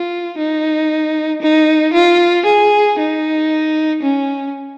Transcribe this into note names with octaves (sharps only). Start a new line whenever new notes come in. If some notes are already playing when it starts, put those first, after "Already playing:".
Already playing: F4
D#4
D#4
F4
G#4
D#4
C#4